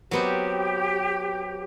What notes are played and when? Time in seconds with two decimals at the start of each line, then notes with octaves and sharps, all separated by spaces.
0.11 F#3 B3 C4 G4